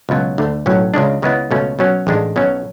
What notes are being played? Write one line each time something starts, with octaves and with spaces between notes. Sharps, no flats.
C#2 B2 F#3
D2 D3 A3
B1 A2 F#3 C#4
C#2 C#3 G#3 D4
C#2 C#3 G#3 B3 E4
C#2 B2 A3 C#4
B2 F#3 C#4
A1 G#2 G#3 D4
B1 B2 F#3 C#4